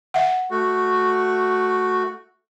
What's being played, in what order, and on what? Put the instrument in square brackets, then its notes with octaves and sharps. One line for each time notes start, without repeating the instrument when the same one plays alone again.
[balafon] E5 F#5
[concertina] A3 F#4